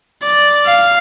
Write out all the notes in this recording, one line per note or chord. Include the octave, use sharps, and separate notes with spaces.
D5
F5